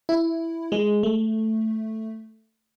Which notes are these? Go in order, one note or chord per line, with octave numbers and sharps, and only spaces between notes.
E4
G#3
A3